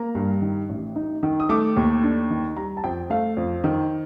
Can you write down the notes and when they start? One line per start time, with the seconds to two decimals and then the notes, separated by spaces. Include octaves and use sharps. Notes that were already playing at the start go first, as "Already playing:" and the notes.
Already playing: A#3 A#5
0.15 G2
0.42 D#3
0.69 A1
0.96 D#4
1.23 D#3
1.40 D#6
1.49 A3 D6
1.76 D#2
2.03 D4
2.30 D#3
2.56 G3 A#5
2.77 A5
2.84 F2 G5
3.10 A3 F5
3.37 F2
3.64 D#3